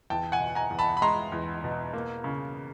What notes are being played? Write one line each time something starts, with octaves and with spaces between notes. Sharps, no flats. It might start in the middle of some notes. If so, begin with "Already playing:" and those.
E2 G5 A5
F#5 G#5
B2
G#5 A#5
E2
A5 B5
B5
G#3 A#5 C6
E2
B2
A#3
C#3